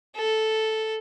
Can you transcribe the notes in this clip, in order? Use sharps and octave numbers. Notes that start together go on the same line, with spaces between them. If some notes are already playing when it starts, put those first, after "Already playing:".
A4